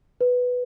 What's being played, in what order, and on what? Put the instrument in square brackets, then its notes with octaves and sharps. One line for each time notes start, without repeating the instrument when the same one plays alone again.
[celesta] B4